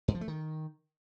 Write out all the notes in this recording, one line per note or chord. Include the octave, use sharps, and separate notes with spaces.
G2
F3
A3
D#3